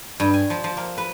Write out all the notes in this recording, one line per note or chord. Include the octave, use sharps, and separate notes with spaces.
G2
G#5
F3
F3
A#3
B4